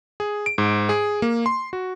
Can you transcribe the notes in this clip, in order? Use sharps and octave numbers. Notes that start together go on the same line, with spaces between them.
G#4
D7
G#2
G#4
A#3
C6
F#4